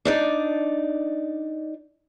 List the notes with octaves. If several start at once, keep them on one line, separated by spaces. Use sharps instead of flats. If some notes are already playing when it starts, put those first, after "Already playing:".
D4 D#4 D5